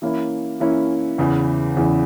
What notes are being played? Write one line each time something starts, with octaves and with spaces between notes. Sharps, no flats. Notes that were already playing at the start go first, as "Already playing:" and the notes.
E3 A#3 C#4 E4
E3 A#3 C#4 E4
E2 C#3 E3
E2 C#3 E3